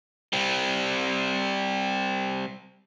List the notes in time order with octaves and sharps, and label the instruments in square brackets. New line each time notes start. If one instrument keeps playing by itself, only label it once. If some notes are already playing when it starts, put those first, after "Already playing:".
[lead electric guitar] G3 C4